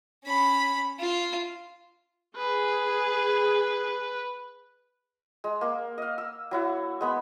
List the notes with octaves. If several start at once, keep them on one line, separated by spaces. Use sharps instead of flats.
C#4 B5
F4
G#4 B4
G#3
A#3
D#5 F5
E6
F#3 E4 F#5
G#3 B3 B5